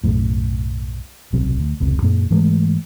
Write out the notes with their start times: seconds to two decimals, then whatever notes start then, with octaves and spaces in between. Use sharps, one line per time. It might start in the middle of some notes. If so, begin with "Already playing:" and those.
0.04 B1 F#2 A2
1.33 D1 B1 C3 F#3
1.60 D2
1.80 F1 C#2 C3
2.02 F#2 A#2 A#3
2.30 G#2 E3 G#3 A3